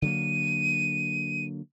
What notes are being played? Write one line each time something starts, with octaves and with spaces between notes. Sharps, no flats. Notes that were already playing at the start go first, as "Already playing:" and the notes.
D3 F#3 A#3 D#7